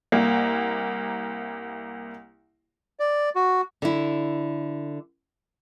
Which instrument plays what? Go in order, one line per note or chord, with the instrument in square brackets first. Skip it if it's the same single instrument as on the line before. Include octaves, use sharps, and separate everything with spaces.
[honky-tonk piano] C2 A#3
[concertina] D5
F#4
[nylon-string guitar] D3 E4